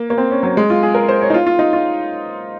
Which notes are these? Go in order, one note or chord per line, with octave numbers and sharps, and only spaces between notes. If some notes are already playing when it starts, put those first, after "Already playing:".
Already playing: A#3
A#3
C4
C#4
F#3
G#3
F4
G#4
A#4
C5
C#5
D#4
F4
F4
D#4
F4